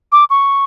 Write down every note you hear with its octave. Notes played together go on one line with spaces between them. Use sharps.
D6
C#6